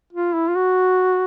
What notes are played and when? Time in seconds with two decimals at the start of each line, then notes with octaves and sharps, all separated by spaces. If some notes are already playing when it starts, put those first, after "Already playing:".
0.13 F4
0.34 E4
0.48 F4
0.55 F#4